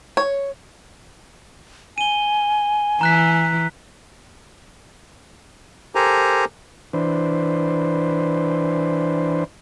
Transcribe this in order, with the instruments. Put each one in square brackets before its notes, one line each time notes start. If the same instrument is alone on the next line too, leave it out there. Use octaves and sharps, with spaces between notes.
[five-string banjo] C#5
[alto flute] G#5 [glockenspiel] D#7 G7
[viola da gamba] E3 [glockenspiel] A#5 F#6 B6
[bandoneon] G4 A4 A#4 C5 G#5 A#5
[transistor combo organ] E3 D4 B4 C5